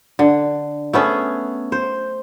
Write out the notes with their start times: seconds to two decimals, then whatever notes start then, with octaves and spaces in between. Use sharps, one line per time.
0.19 D3
0.93 A3 B3 C#4 G#4
1.72 C5